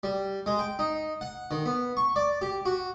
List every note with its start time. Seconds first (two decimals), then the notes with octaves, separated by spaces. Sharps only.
0.03 G3
0.46 G#3
0.59 G5
0.79 D#4
1.21 F#5
1.51 D#3
1.66 B3
1.97 C#6
2.16 D5
2.42 G4
2.66 F#4